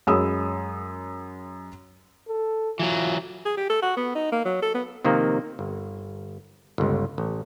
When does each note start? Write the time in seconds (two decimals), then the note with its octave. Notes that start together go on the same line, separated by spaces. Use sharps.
0.07 F#2 G#3 C#5 B5 D#6 E6
2.28 A4
2.79 E3 F#3 F4
3.45 G#4
3.57 G4
3.70 A4
3.82 F#4
3.97 B3
4.15 D#4
4.32 A#3
4.45 F#3
4.62 A4
4.74 B3
5.05 C3 D#3 F3 A#3 C4
5.59 G1
6.78 G1 C#2
7.18 A1